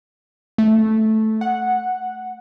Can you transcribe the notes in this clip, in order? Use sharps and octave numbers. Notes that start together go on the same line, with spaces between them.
A3
F#5